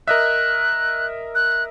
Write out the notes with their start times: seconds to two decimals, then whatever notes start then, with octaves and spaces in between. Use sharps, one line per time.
0.08 A#4 D#5 E5 F#6
1.35 F#6